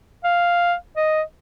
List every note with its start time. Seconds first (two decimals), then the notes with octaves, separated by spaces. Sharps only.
0.24 F5
0.96 D#5